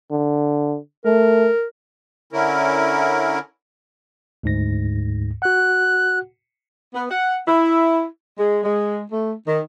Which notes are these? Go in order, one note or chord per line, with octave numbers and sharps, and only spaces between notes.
D3
A3 A#4
D3 C#4 E4 A#4
D2 G#2 A#6
F#4 F#5 F#6
B3
F#5
E4
G#3
G#3
A3
D#3